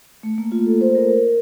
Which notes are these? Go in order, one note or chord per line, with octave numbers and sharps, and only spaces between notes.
A3
A#3
F4
A4
C5
A#4